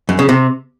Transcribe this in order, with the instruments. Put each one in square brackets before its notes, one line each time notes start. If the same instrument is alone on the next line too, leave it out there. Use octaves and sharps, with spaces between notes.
[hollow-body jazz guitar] F#2
C#3
C3